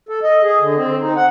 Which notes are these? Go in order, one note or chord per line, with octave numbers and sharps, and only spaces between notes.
A4
D#5
G#4
D3
C4
D#4
F#5